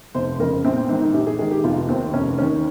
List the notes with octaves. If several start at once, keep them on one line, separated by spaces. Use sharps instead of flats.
F1 C5
F2 C#3 A#4
A#1 C4
C4
G#2 D#3 C4
D#4
A#1 G4
G#4
G#2 D#3 G#4
G4
F1 F4
D#2 D#3 C4
F1 C#4
D#2 D#3 C#4